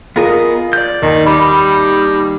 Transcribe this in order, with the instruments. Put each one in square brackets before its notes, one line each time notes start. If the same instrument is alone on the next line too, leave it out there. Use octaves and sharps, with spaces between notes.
[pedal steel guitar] B3 A#4 D#5 [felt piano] F4 G#4
[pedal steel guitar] D5 G6
[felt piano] D#2 [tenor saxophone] D#3
[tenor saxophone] G3 [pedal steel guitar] D#4 B5